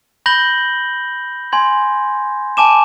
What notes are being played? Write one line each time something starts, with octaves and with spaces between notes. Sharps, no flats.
B5 G6 A#6 F#7 G7
G#5 C6 G#6
G#5 A5 D6 E7